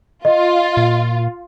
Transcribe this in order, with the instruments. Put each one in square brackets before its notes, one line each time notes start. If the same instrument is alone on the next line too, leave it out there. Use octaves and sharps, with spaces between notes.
[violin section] F4 [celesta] D#5
[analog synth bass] A#2